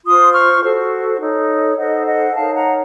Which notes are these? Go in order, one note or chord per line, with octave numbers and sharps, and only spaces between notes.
F4 C5 C6 D#6
C#6 F6
F#4 A4 C5
D#4 A4 C#5
D#4 A4 C5 D#5 F#5
D#5 F#5
D#4 A#4 C#5 F5 A5
F#5 A#5